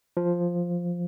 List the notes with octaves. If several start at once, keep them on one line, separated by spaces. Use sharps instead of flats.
F3